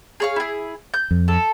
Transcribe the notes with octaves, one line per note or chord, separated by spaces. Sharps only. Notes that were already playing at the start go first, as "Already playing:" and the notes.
G#4 C#5 F5
E4 G#4
G6
F2
A4